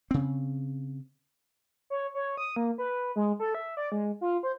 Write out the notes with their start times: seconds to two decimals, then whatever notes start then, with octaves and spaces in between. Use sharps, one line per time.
0.11 C#3 C4
1.90 C#5
2.14 C#5
2.37 D#6
2.56 A#3
2.78 B4
3.16 G#3
3.40 A4
3.55 E5
3.77 D5
3.92 G#3
4.21 F4
4.43 C5